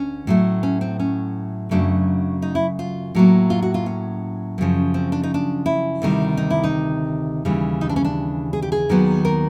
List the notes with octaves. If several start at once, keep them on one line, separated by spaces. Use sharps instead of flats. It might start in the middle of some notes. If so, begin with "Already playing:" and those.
Already playing: D2 D3 C#4
A2 F#3 A3
C#4
C4
C#4
F#2 C#3 F#3 A3 D4
D#4
E4
F4
A2 F#3 A#3
F4
F#4
F4
C#4
F#2 C#3 F3
C4
D4
D#4
D4
E4
D2 C3 D#3 G3
D#4
E4
D#4
D#2 C#3 E3 G3
D#4
D4
C#4
D4
G#4
G4
G#4
D#2 D#3 F#3 B3
A#4